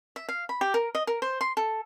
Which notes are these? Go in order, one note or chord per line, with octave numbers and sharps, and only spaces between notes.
E5
F5
B5
G4
A#4
D#5
A#4
C5
C6
A4